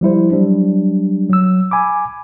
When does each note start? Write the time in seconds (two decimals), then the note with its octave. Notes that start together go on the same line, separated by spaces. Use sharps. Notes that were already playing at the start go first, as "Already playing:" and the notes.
0.01 F3 G3 E4 C5
0.32 F#3 G3 D4
1.29 F#3 E6
1.71 G#5 B5 D6